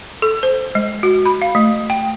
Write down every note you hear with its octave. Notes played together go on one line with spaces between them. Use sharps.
A4
C5
G#3
F#4
B5
F5
A3
G5